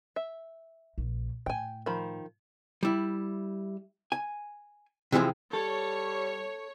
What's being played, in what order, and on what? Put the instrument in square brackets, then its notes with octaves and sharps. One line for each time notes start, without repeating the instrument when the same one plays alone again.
[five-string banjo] E5
[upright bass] A#1
[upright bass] A2 [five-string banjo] G5 G#5
[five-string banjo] D#3 F3 B5
[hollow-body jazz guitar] G3 E4
G#5
C3 E3 F3 G#3 C4
[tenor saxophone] G3 [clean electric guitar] A4 [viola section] C#5